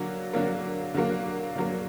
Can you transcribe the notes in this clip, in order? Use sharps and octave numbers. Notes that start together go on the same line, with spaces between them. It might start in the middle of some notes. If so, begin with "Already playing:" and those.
Already playing: D3 F#3 A#3
D3 F#3 A#3
D3 F#3 A#3
D3 F#3 A#3